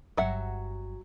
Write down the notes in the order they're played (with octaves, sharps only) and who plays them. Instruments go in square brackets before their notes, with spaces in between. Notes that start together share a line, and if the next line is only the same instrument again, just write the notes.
[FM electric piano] G1 G2 [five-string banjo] F#3 E5 F#5